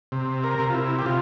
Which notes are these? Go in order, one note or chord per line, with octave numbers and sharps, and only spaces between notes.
C3
A#4
C3
F4
E4
G4
C3 F4